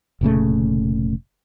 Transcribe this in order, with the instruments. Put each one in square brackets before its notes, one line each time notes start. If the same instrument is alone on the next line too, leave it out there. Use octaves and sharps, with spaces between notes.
[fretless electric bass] F1 A#2 C#3 A3